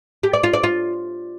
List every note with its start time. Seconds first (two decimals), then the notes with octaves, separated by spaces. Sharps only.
0.23 G4
0.33 D5
0.43 F4
0.53 D5
0.63 F4